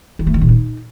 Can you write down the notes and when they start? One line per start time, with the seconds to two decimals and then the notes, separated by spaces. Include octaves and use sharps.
0.19 D#3
0.27 A3
0.34 D#3
0.41 A#2
0.49 D#4